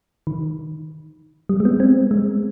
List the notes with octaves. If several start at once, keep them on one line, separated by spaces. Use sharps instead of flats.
D#3
G3
G#3
B3
C4
G#3